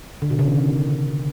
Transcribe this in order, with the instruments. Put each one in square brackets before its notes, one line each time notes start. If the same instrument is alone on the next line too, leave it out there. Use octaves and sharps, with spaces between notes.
[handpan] D3
B2
C#3
D#3